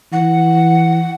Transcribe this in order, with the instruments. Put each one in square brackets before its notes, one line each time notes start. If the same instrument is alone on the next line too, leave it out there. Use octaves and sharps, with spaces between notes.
[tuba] E3 [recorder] F#5